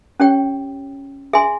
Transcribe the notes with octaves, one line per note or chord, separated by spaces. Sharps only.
C#4 G4 C#5 G5
G#4 E5 G#5 C6